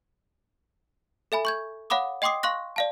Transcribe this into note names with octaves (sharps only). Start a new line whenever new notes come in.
A4 E5 G#5 B5
C#6 G6 G#6
C#5 F5 F#5 B5 D6 D#6
D#5 G5 C6 D6 D#6 C7
F5 C6 C#6 F#6 A#6
D5 F5 A5